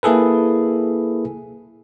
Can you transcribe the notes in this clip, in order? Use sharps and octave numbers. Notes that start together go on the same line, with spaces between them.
A#3 E4 G#4 A4 B4